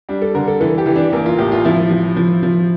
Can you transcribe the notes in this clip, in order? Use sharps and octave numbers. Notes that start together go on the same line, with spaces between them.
G3 D4
A4
D3 A#4
A4
E3 A4
G4
E3
D4
A1 A#3
F4
A2 G4
F4
F3 E4
F3
F3
F3